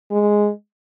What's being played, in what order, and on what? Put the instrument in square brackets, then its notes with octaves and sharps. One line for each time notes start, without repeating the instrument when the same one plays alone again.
[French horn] G#3